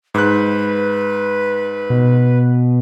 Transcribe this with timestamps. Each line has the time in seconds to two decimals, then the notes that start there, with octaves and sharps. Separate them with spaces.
0.14 G#2 B4 F#6
1.90 B2